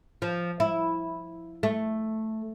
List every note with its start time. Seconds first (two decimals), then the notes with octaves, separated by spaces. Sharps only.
0.22 F3
0.60 E4
1.63 A3